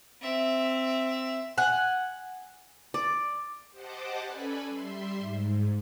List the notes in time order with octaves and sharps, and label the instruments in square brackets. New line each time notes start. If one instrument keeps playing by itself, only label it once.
[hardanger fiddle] C4 E5
[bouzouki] F#5 G#5
[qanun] D5
[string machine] G4 C5 D#5 F#5 A5 D6
C#4 A4 B4 D5 G#5 B5
G3 E5 C6
G#2